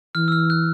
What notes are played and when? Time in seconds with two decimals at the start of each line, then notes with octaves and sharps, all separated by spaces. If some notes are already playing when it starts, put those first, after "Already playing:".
0.15 E3 F6
0.28 E6
0.32 F6
0.50 F#6